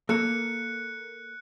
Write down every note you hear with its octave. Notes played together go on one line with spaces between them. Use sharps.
A#3 A4 A#4 F#6 C#7